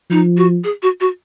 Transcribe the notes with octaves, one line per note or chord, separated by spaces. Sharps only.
F3 D#4
F#4
G#4
F#4
F#4